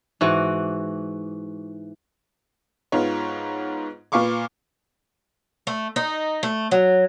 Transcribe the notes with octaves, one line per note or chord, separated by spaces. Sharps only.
G#2 E3 F#4
G#2 B3 F4 C#5
A#2 B4 F5 C#6 D6
A3
D#4
A3
F#3